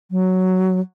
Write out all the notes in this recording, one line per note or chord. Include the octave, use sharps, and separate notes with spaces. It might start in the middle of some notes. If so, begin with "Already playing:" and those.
F#3